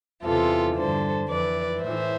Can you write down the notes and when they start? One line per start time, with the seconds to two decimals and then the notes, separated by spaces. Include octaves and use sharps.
0.23 E2 C3 E3 F4 A4
0.75 G2 D3 A4 C5
1.28 F2 E3 B4 D5
1.82 A2 E3 C5 E5